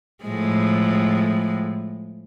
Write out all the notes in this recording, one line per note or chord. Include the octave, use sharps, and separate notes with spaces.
A2 F3 G#3